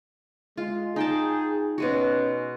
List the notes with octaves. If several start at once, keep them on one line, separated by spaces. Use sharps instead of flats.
G#3 F4
D#4 G#4 G5 A5
B2 G#3 C#4 F#4